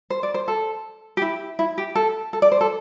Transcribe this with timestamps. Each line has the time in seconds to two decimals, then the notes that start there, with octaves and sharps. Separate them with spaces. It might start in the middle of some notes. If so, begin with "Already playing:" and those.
0.10 C5
0.23 D5
0.34 C5
0.48 A4
1.17 G4
1.22 E4
1.59 E4
1.78 G4
1.95 A4
2.33 A4
2.42 D5
2.52 C5
2.61 A4